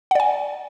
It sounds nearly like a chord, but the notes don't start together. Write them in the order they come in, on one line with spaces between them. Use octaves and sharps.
F#5 D5 G#5